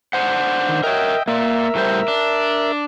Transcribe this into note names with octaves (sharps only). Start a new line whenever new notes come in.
D4 C5 F#5
D#3
A#4 C#5 D#5 E5 G5
A#3 A#4 D5 E5
A2 G3 C5
D4